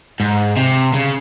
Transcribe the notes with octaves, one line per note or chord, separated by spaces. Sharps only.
G#2
C3
C#3